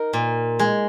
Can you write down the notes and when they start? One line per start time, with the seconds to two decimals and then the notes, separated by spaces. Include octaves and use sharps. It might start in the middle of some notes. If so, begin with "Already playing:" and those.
Already playing: D#4 A#4
0.13 A#2
0.59 G#3